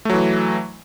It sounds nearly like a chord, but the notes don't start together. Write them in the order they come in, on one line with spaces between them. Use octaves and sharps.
A3 F#3 E3